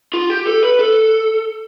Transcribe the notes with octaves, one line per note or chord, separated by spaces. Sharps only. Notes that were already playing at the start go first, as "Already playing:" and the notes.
F4
G4
A4
B4
A4